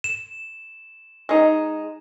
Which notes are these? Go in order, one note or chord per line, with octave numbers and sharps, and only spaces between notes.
E7
G#3 D#4